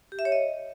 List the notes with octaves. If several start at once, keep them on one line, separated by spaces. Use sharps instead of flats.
G4
E5
C#5
D#5